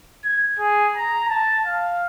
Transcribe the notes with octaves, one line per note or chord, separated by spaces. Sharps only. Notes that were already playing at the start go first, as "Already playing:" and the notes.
G#6
G#4
A#5
A5
F5